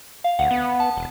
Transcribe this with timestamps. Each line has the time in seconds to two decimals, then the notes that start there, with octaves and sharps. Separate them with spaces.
0.24 F5
0.39 D2 F#5
0.51 B3
0.80 A5
0.97 E1